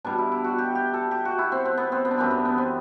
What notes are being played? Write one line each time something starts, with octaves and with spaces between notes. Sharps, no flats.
B2 G3 D4
E4
E4
F#4
G4
G4
A4
G4
F#4
E4
C4
C4
B3
C4
B3
D4
F#2 E3 G3 C4
B3
B3
C4